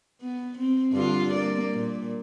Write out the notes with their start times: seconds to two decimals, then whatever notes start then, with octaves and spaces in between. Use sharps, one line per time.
0.22 B3
0.58 C4
0.92 G2 D3 F4
1.33 A#3 D5
1.74 A#2